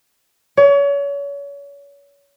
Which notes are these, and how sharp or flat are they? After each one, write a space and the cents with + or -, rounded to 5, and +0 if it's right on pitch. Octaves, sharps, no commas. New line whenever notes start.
C#5 +35